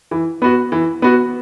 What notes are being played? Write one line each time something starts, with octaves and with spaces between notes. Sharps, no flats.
E3
B3 F#4
E3
B3 F#4